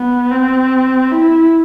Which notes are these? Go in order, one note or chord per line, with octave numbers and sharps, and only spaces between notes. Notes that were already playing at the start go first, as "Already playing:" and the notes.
Already playing: B3
C4
E4